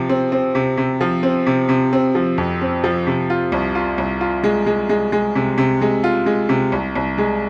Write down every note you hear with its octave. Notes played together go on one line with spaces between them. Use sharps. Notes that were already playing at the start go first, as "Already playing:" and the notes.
Already playing: C3 F3
C4
C4
C3
C3
F3
C4
C3
C3
C4
F3
F2
C4
F3
C3
F4
C2
F4
C2
F4
G#3
G#3
G#3
G#3
C3
C3
G#3
F4
G#3
C3
C2
C2
G#3